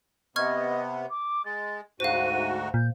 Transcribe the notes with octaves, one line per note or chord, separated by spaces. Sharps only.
C3 B3 D#5 C#6 F6 G#6
D6
G#3 A6
D2 G#2 F#4 C5 F5 D#7
A#2 G6